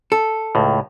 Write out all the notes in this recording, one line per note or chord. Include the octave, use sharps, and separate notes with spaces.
A4
C#2 A2